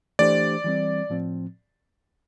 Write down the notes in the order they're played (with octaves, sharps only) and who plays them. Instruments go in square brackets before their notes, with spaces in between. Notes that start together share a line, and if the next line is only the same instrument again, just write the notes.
[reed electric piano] E3 A3 D4 G4 C5 [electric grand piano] D5
[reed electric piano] E3 G3 C4
A2 F3 C4